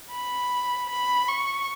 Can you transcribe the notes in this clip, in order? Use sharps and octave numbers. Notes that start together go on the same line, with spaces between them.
B5
B5
C#6